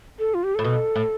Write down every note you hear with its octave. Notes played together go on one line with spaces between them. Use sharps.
A4
F4
G4
A2 A4
B2
A2